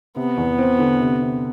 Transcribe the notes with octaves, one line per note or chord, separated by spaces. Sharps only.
C3 B3
E2
C4
D3
C3
C3